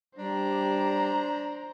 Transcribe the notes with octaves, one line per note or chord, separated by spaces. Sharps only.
G3 D4 C5 A#5